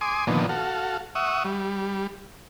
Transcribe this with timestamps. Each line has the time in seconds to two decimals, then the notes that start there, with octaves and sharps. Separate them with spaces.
0.01 G#5 C6 D6 D#6
0.27 A#2 D3 D#3 F3 B3
0.49 F#4 A4 F5
1.15 E5 F#5 C#6 D#6
1.45 G3